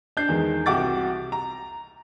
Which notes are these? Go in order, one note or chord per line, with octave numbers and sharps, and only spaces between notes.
D4 G6 C7
E2 D#3 G#3
C2 F#4 G4 F#5 D6 A6
A#5